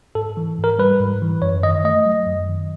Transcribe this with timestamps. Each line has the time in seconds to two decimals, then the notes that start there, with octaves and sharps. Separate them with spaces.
0.15 G#2 A4
0.37 E3
0.58 G#2
0.64 A#4
0.79 G3 B4
1.00 G#2
1.22 E3
1.42 F#2 C#5
1.63 D#3 D#5
1.84 A3 D#5
2.06 F#3
2.27 F#2
2.48 D#3